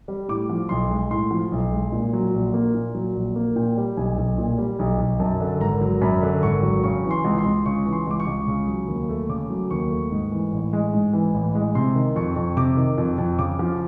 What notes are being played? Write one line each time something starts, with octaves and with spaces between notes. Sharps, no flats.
G3
A2 D6
F3
B1 C6
G#3
A2 C6
F3
B1
G#3
A#2
F#3
A#1
A#3
A#2
F#3
A#1
A#3
A#2 G5
G3
B1 G#5
B1
A#2
G3
B1
B1
F#2 A5
D3
G#1 A#5
F#3
F#2 B5
D3
G#1 C#6
F#3
C#3 C#6
E3
C6
C#2
C6
C#2
C#3 C#6
E3
C6
C#2 D6
C#6
C#2
C#3
F#3
D#2
A3
C#3 D6
F#3
D#2 C#6
A3
G#2
E3
A1
G#3
G#2
E3
A1
G#3
C3 C6
D#3
F2 C#6
F2
C3 D6
D#3
F2
F2
C#3 D6
F3